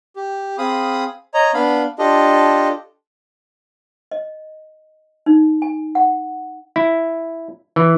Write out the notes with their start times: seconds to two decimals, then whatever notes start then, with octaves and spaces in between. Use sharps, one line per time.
0.16 G4
0.58 C4 G#4 F5 B5 D#6
1.34 C#5 D#5 A#5
1.54 B3 D4 F5 B5
1.99 D4 F4 G4 A4 D#5
4.11 D#5
5.26 D#4
5.62 G#5
5.95 F#5
6.76 E4
7.76 E3